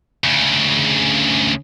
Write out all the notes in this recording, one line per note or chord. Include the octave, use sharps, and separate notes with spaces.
D2 C#3